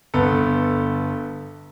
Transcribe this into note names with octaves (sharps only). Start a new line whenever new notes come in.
G1 B3 A4